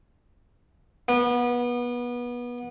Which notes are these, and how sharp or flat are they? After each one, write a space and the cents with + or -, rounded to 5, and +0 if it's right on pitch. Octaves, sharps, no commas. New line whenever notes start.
B3 -25